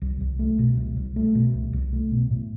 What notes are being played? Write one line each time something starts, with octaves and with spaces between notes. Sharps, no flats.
C2
C2
A3
B2
C2
C2
A3
B2
C2
C2
A3
B2
A2